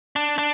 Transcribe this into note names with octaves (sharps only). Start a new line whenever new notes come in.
D4
D4